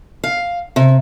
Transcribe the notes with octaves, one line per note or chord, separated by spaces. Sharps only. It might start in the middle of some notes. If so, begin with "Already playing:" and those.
F5
C3